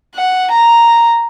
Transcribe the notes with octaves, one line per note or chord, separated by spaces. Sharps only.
F#5
A#5